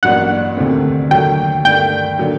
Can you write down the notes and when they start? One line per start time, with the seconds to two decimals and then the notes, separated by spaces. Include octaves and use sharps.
0.03 A1 G2 F#3 A#3 D4 F#5
0.57 D2 C3 D#3 A3 C4
1.11 D#2 D3 F#3 A3 G5
1.64 G2 D#3 A3 D4 G5
2.18 D3 F#3 A#3